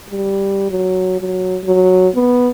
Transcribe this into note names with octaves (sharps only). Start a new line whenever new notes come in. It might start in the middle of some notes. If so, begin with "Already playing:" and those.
G3
F#3
F#3
F#3
B3